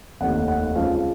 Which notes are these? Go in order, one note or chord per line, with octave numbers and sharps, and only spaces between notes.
F1 D#2 D#3 F#5
F#5
C#2 C#3 F3 F5